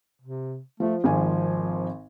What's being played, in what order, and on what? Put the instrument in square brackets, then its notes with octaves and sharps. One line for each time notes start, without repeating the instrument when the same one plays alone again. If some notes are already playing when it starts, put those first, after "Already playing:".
[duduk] C3
[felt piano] F3 [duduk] A3
[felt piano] G#1 D#3 G#5 [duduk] F3